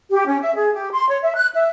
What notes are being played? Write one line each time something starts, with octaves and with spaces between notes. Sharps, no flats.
G4
C#4
E5
G#4
G4
C6
C#5
E5
F#6
E5